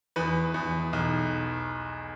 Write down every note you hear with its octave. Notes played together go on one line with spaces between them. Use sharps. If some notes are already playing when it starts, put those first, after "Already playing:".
E2 B4
E2
B1